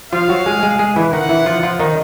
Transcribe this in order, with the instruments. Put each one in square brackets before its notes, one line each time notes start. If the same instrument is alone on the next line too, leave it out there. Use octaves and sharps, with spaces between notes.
[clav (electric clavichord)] F3 F4 [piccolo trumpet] F5
[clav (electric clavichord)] F#3 F#4
G#3 G#4
G#3 G#4
G#3 G#4
E3 E4
[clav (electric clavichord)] D#3 D#4 [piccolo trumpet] F#5
[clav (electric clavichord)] E3 E4
F3 F4
F3 F4
D#3 D#4